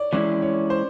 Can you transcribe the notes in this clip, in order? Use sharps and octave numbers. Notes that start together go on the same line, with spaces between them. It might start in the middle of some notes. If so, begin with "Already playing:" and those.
Already playing: C#5 D5
E3 G#3 C#4 E4 D5
C#5
C5